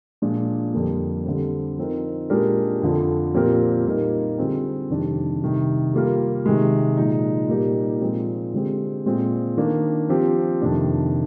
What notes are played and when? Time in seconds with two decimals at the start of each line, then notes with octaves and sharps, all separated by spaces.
0.22 A#2 F3 G#3 D4
0.74 F2 D3 G3 A#3
1.26 D3 G3 C4
1.78 F3 C4 D#4 A#4
2.30 A#2 G#3 D4 G4 A#4
2.82 F2 D3 F3
3.34 A#2 F3 C4 G4 A#4
3.86 A#2 G3 A#3 D#4 A#4
4.38 D3 G3 C4 F4 G#4
4.90 F2 C3 D#3 G3 D4
5.41 C3 D#3 G3
5.94 G3 A#3 F4 A#4
6.46 C3 D#3 G#3
6.97 A#2 F3 G#3 D#4
7.49 A#2 G3 A#3 D#4 G4
8.01 A#2 F3 G#3 C4
8.53 D3 G#3 C4 G4
9.06 A#2 G#3 C4
9.57 D#3 A#3 D4
10.09 F3 C4 G4
10.62 F2 C3 D#3 A#3 D4